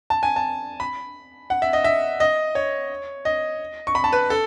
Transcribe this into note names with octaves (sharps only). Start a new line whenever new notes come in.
A5
G#5
A5
B5
F#5
E5
D#5
E5
D#5
C#5
D#5
C#6
B5
A5
B4
A4